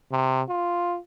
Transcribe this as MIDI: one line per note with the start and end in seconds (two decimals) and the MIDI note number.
0.12 0.42 48
0.49 0.98 65